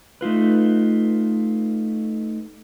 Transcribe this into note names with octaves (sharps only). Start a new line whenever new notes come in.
A3 D#4 F4 B4